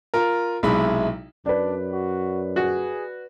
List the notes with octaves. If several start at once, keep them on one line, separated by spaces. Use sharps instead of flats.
F4 A#4
B1 C3 G#3 E4 E5 B5
F#2 D4 B4 D5
F#4
F#4 G#4